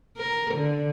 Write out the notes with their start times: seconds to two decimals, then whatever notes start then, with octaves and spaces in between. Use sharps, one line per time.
0.18 A#4
0.54 D3